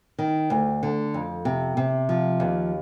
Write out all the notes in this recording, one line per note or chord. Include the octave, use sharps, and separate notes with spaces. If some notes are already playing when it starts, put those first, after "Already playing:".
D#3
D2
D3
F2
C3
C3
F3
D#2